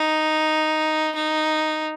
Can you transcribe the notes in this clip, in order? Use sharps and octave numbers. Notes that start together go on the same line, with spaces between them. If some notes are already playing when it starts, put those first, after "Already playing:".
Already playing: D#4
D#4